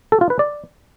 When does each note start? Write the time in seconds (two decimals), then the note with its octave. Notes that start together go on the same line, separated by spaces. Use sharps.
0.12 A4
0.21 F4
0.30 B4
0.39 D5